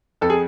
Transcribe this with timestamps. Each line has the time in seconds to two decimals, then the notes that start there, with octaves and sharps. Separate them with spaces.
0.21 F2 A4
0.30 G#4